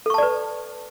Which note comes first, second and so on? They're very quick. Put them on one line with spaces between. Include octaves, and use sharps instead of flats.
A4 C#6 A5 D5 B4